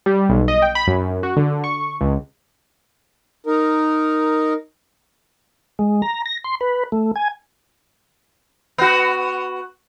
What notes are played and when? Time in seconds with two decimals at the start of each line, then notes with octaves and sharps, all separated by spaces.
0.06 G3
0.29 B1
0.48 D#5
0.62 G5
0.75 B5
0.87 F#2
1.23 F#4
1.36 D3
1.64 C#6
2.01 C#2
3.46 D#4 A#4
5.79 G#3
6.02 A#5
6.26 A#6
6.44 C6
6.61 B4
6.92 A3
7.16 G#5
8.78 B3 F#4